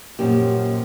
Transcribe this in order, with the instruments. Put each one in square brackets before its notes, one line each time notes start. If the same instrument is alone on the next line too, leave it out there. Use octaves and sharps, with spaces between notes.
[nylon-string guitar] F#2 A#2 F3 C#4 G4